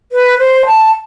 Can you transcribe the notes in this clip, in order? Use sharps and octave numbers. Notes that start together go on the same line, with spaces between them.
B4
C5
A5